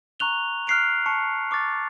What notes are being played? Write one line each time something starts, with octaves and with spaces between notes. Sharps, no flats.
A#5 C#6 F#6 F7 G7
F6 F#6 B6 C7 D7 F7
A5 C#6 C#7
C#6 D6 F6 A6